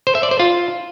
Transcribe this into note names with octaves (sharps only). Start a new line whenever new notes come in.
C5
E5
D5
C5
F4